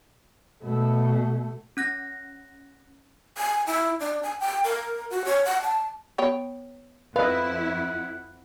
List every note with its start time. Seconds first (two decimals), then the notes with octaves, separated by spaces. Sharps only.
0.64 B2 A3
1.77 C#4 F#6 A#6
3.38 G#5
3.67 E4
4.00 D4
4.23 G#5
4.40 G5
4.64 A#4
5.10 F#4
5.25 C#5
5.45 F#5
5.62 A5
6.18 B3 C#5 G5
7.16 F2 E4 B4 D#5 F5 F#5